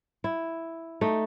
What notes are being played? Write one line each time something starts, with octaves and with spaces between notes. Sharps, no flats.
E4
A3 D#4